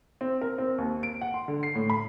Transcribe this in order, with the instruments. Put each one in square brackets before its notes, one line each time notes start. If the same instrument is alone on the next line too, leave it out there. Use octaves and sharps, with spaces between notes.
[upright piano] C4
A#4
C4
D#2
D7
F#5
C6
D3
C7
A2
B5